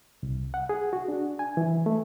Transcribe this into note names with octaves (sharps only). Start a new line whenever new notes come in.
C2
F#5
G#4
F#4
D4
G#5
E3
A3